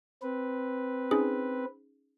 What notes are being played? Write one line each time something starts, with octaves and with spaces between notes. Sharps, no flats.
C4 B4
C#4 D#4 G#4